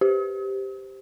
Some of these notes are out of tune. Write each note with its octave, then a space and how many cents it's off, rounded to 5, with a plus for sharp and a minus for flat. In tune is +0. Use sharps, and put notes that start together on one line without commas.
G4 +0 C5 +0